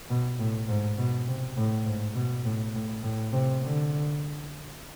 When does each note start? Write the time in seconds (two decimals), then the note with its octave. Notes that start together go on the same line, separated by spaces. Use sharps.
0.10 B2
0.39 A2
0.68 G#2
0.98 B2
1.27 C3
1.56 A2
1.85 G#2
2.15 B2
2.44 A2
2.74 A2
3.03 A2
3.32 C3
3.62 D3